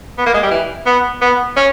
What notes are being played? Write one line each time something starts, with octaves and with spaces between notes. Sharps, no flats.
B3
A#3
G#3
G3
E3
B3
B3
C#4